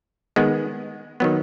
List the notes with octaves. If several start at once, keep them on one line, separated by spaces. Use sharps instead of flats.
D#3 G#3 B3
D#3 F#3 B3